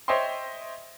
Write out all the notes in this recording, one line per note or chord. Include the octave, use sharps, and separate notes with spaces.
C5 C#5 D#5 E5 G5 C6